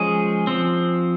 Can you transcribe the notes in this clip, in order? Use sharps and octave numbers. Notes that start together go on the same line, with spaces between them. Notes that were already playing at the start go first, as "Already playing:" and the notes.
Already playing: F3 G#3 C#4 G#4
F3 C4